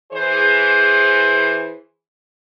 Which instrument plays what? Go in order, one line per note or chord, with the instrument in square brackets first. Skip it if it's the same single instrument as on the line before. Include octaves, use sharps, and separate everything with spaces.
[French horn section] E3 G#4 C5